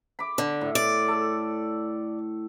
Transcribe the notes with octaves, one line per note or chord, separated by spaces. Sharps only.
B5 D6
D3
A2
D5
A4